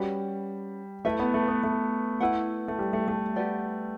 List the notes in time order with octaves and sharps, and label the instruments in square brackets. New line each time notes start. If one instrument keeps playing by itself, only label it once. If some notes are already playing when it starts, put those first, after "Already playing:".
Already playing: [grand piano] G3 [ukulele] C#4 F#4 B4
[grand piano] A3 [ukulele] E4 B4 E5
[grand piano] B3
A3
B3
A3
[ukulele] E4 B4 F#5
[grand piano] A3
G3
A3
A3
[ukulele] G4 B4 D5 F#5